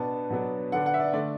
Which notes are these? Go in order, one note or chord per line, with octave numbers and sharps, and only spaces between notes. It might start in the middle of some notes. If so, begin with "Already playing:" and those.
Already playing: B2 B3 D4 A5
B2 F#3 B3 D4
D3 B3 D4 F#5
F#5
E5
D5
D3 A3 D5